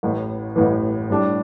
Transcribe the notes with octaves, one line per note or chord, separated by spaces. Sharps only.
A1 A2 E3
A1 A2 E3
A2 G3 D4